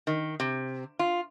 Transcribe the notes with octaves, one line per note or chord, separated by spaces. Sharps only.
D#3
C3
F4